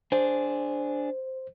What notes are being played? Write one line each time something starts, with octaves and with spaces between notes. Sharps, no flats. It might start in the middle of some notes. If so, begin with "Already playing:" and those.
D4 G#4 C5